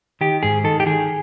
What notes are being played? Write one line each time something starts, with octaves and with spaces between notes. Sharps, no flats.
D#3 G4
G#2 G#4
D#3 A4
G4
D#3 G#4